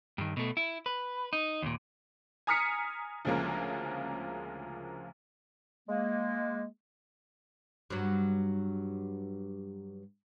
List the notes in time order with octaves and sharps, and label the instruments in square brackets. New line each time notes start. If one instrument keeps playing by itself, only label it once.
[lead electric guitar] G2 D#3
B2 A3
E4
B4
D#4
D#2 A#2
[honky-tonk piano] G#5 A#5 D#6 F6 B6 C#7
D2 C#3 F3 G#3 A#3
[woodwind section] G#3 A#3
[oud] G2 F#3